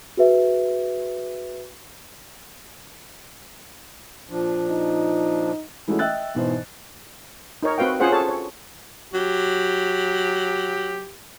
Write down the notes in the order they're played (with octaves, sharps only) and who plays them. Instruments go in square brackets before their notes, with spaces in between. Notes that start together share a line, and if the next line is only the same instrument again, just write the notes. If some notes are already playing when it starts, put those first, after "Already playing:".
[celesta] F#4 G#4 B4 E5
[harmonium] A#2 F3 D4
[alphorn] D#4
[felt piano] E3 G#3 A3 C#4 E4 F#4
D#5 E5 G5 E6 F#6 A6
G#2 B2 E3 C5
[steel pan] D#4 A#4 C#5
C4 F#4 B4 F5 G5
C#4 F4 G#4 C5 F#5
G#4 A4 C#5 A5
C#5
[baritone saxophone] F#3 [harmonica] G4